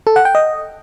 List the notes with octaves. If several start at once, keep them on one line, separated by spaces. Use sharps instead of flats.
A4
F#5
G5
D#5